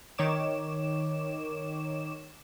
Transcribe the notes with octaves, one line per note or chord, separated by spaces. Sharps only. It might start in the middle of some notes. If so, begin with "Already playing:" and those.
D#3 C#5 D6 E7